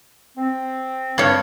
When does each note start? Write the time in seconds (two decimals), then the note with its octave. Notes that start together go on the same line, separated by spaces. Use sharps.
0.38 C4
1.18 G2 C#5